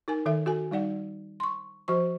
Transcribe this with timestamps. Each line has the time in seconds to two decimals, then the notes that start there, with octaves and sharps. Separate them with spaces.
0.08 D#4 A#4 G#5
0.26 D#3 A4 E5
0.46 F#4 A4 G#5
0.71 G3 D#4 D5 F#5
1.40 C6 C#6
1.88 F3 F#4 C5 C#6